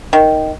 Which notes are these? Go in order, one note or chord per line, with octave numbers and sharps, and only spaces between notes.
D#3